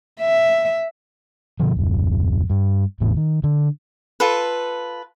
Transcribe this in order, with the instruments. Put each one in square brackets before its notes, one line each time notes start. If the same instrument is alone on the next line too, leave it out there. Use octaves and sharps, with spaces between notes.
[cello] E5
[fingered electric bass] B2 D3 F3
D#1 F#2
G2
G#1 E2 A2 C3
D#3
D3
[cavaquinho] F4 A4 B4